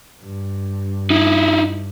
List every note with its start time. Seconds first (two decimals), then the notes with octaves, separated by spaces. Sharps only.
0.22 G2
1.10 D#4 E4